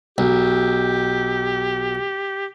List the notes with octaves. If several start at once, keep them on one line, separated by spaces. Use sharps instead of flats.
B1 G4